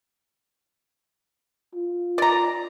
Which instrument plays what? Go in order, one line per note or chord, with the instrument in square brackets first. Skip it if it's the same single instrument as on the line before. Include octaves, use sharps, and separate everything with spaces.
[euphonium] F4
[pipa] D5 A#5